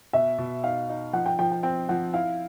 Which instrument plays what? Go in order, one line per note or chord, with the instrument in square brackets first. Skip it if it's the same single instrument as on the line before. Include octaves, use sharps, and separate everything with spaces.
[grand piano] B2 [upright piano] E5
[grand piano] B2
[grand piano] D#4 [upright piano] F5
[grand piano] D#4
[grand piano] F3 [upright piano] F#5
[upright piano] G5
[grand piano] F3 [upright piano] G5
[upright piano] G5
[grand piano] C4 [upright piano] G5
[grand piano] F3 [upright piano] F#5
[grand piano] E4 [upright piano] F5